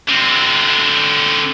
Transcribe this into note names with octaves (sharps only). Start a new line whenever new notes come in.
D3 C4